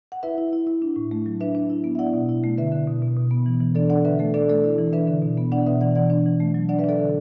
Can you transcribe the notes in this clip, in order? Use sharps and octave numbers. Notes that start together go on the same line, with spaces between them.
F#5
E4 B4 E5
E4
E4
E4
D4
A2
A3
F#3
D4 B4 E5
D4
E4
B3
E5
E4 D5 F#5
B2
E4
A3
D3 B4 E5
D3
B2
B2
B2
B3
E3
E3
D4 A4 D5
D4 D5 F#5
D3 B4 E5
A3 A4
D4 A4 D5
A3 A4 D5
E4
E3
D4 B4 E5
D3
B2
B3
D4 D5 F#5
B2 B4 E5
E3 D5 F#5
E3 D5 F#5
D4
E3
A3
F#3
D4 D5 F#5
B4 E5
D4 A4 D5
D3